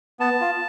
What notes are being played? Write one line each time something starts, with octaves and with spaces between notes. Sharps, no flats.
B3 A5
F4